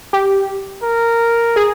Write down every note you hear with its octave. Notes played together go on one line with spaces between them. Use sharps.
G4
A#4
G#4